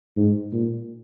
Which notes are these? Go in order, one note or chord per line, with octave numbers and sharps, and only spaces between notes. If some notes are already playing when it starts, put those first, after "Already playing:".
G#2
A#2